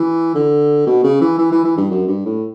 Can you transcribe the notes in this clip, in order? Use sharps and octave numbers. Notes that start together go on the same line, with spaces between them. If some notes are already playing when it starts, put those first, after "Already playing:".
Already playing: E3
D3
B2
C#3
E3
E3
E3
E3
G2
F#2
G2
A2